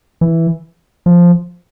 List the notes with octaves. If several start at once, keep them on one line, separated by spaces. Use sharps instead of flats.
E3
F3